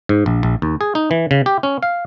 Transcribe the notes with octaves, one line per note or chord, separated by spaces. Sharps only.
G#2
A#1
A#1
D#2
G#4
D#4
E3
C#3
G4
C#4
F5